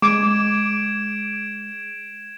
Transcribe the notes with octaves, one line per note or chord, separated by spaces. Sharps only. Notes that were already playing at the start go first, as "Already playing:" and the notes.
G#3 D6 G#6 D7 E7